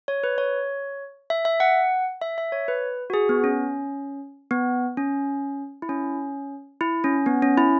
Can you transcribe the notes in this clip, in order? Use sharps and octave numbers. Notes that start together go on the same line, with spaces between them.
C#5
B4
C#5
E5
E5
F#5
E5
E5
C#5
B4
F#4
G#4
B3
C#4
B3
C#4
E4
C#4
E4
C#4
B3
C#4
E4